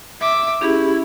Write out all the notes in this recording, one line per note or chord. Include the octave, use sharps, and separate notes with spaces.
E5 D6
C#4 E4 G4 G#4